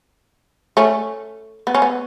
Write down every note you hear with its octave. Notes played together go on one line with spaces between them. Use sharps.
A3 C#4
B3
C#4
B3